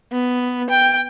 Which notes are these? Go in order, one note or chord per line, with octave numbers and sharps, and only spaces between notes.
B3
G5